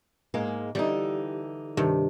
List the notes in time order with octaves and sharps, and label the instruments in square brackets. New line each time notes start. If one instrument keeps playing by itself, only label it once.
[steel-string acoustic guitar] G#2 G#3 A#3
[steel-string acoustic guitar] D3 E3 D#4 [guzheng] G3
[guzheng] G2 C3 D#3